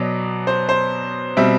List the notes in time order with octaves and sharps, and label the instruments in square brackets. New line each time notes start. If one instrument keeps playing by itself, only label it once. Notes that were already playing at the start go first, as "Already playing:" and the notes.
Already playing: [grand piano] B2 F#3 B3 D5
C5
C5
B2 G3 C4 E5